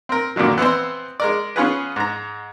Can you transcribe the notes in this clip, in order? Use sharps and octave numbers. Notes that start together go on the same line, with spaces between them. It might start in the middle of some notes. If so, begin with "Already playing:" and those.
C4 A#4
F#2 A#2 D3 D#3 F#3
E3 B3 C4 C5
G#3 A#4 D5
B3 C#4 F4 G#4 B4
G#2 A#5